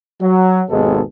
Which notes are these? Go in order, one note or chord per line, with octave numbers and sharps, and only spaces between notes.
F#3
G#1 D#2 B2 G#3 G#4 A4